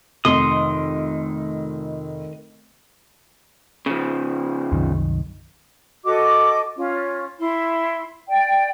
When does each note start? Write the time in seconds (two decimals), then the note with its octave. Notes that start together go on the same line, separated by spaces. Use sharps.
0.25 F1 D#3 C6 D#6
3.86 C#3 F3
4.72 C2 F#2 D#3
6.04 F#4 A4 D#5 D6
6.76 C#4 F4
7.39 E4 C6
8.28 D5 G5